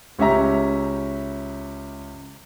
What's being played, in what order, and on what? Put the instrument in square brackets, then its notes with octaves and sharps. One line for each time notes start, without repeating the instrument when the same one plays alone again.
[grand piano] C#2 C#4 G4 E5 A#5